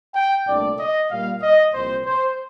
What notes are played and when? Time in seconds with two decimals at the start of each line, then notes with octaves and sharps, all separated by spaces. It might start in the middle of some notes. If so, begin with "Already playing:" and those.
0.16 G5
0.46 C2 A#2 A3 D4 D5
0.79 D#5
1.10 A#2 G3 A#3 F5
1.42 D#5
1.74 C2 A#2 F3 C4 C5
2.06 C5